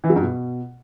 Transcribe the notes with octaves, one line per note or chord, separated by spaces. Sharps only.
E3
F#3
G2
B2